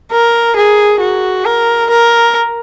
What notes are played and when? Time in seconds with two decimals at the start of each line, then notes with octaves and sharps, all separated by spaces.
0.12 A#4
0.56 G#4
1.00 F#4
1.45 A#4
1.90 A#4